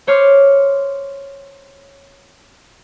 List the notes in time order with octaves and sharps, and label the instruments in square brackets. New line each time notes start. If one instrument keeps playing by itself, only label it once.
[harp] C5 C#5 C6 D6 F6